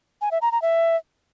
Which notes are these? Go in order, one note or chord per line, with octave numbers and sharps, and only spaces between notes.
G#5
E5
A#5
A#5
E5